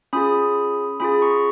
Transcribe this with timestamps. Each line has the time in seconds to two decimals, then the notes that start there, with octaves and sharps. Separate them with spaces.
0.13 C#4 F4 G#4 B5 D#6
1.00 C#4 F4 G#4 B5 D#6
1.22 A#5 C#6